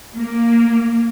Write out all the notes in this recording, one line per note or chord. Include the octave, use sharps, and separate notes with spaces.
A#3